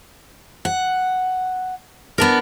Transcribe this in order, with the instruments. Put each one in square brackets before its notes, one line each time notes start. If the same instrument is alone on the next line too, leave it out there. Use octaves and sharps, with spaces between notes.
[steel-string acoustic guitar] F#5
B3 D4 A#4